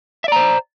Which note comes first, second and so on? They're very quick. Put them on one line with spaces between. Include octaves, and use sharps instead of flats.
E5 D5 A#5 C5